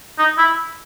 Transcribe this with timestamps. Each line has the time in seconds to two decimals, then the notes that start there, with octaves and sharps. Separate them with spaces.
0.18 D#4
0.38 E4